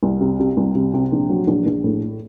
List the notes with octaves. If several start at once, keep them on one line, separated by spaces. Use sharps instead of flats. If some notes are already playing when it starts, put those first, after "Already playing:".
C2
C3
C3
C2
C3
C3
A#1
F#3
A#1
A#1
A2